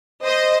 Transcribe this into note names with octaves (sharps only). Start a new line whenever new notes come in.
C5 D#5